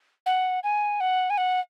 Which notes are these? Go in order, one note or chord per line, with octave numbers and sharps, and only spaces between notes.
F#5
G#5
F#5
G#5
F#5